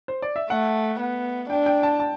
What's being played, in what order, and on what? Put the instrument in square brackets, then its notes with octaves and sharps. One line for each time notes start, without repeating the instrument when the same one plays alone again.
[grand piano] C5
D5
E5
[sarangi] A3 [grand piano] F#5
[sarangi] B3
[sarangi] D4 [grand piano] G5
[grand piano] G5
A5
A5